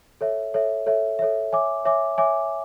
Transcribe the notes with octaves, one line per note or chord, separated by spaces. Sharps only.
A4 C#5 E5
A4 C#5 E5
A4 C#5 E5
A4 C#5 E5
C#5 E5 G#5 D6
C#5 E5 G#5 D6
C#5 E5 G#5 D6